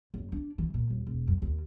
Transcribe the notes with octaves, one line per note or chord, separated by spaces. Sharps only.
F#1
D4
E3
A#2
D#1
E1
F#2
D#2